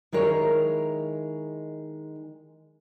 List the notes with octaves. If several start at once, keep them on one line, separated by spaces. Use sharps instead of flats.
D#3 G#3 E4 A#4 C#5